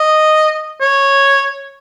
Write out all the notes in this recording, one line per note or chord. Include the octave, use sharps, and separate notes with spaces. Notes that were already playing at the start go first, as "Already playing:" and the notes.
Already playing: D#5
C#5